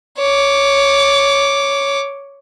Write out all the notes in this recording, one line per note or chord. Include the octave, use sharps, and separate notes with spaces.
C#5 D6